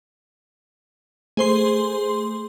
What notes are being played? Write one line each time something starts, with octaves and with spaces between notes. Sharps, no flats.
A3 G#4 C5 C6